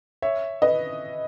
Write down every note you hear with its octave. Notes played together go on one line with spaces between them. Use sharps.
C#5 E5
B4 D#5